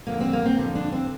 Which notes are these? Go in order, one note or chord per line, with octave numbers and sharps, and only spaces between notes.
F2 D3 A#3
C4
A#3
C4
F2 D3
D4
C4